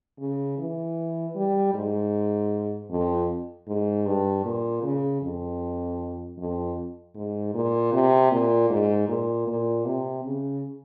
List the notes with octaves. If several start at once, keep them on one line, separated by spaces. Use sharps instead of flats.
C#3
E3
G3
G#2
F2
G#2
G2
A#2
C#3
F2
F2
G#2
A#2
C3
A#2
G#2
A#2
A#2
C3
C#3